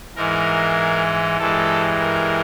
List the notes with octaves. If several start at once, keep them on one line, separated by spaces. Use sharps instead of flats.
G#2 E3 G#3 A#4
G2 E3 G#3 A4
A#4